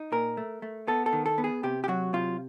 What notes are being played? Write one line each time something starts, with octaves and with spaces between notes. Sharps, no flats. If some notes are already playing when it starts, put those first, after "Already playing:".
Already playing: D#4
A#2 A#4
A3
A3
B3 A4
A4
D#3
A4
B3
G#4
C3 G4
G4
F#3 F#4
C3 F4